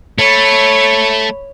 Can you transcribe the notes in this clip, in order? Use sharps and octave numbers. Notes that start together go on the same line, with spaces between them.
A3 C#5 B5